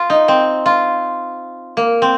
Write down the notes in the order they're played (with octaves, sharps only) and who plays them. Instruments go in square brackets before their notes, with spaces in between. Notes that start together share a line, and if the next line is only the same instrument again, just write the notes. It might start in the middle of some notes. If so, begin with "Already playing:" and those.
Already playing: [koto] F4
D#4
C4
F4
A#3
C4